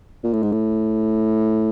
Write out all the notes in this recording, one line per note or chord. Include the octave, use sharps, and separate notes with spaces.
A#2
A2
G#2
A2